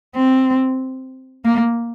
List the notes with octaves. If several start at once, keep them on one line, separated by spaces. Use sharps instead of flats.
C4
A#3